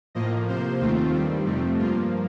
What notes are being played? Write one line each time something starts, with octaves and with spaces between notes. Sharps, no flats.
A2 F3 A#3 D#5
C3 F3 A#3 C5
D#2 D#3 A3 C4 F4
G2 D#3 G3 C4
F2 C3 F3 A3 C4
G2 F3 A#3 F4